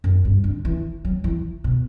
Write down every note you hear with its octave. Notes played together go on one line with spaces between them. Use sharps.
F#2
G2
D3
E3
F#3
E3
B2